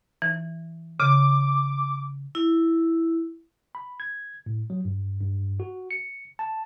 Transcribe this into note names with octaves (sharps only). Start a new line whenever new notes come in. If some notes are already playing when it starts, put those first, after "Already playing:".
E3
C#3 D6
E4
B5
G#6
A2
F#3
G2
G2
F#4
C#7
A5